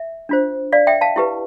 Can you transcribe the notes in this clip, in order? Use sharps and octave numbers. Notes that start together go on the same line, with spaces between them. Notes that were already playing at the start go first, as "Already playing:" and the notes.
Already playing: E5
D4 F4 C5
D5 F5
E5 G5
F5 A5
E4 G4 B4